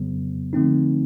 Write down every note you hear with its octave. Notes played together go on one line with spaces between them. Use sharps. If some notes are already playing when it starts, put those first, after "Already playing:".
Already playing: F2 C#3 F#3 B3
D3 F3 A3 C4 D#4